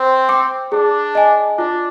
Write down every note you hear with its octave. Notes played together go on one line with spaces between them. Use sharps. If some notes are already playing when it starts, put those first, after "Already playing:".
Already playing: C4 C5
G5 D6
D4 G#4
D#5 G#5
D4 F4